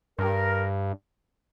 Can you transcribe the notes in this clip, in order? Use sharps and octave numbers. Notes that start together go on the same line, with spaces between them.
G2 A#4